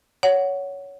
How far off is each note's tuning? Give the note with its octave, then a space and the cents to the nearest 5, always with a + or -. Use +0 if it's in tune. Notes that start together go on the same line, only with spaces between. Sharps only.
C#5 +15 F#5 +0